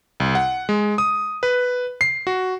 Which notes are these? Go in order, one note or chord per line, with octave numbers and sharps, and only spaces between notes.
C2
F#5
G#3
D#6
B4
C7
F#4